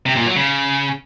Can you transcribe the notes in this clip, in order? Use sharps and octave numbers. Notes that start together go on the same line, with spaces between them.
C3
A#2
F#3
C#3